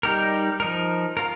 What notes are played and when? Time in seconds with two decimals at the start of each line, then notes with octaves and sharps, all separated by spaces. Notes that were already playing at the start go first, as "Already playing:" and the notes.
0.03 G3 D#4 G4 A#4
0.60 F3 D#4 A#4
1.17 F4 A#4